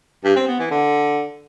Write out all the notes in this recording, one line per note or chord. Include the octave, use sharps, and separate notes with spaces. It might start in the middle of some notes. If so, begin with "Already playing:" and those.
G2
C4
B3
E3
D3